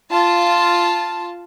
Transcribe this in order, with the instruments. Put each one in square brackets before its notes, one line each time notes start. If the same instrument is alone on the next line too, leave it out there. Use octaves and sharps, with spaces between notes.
[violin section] F4 A5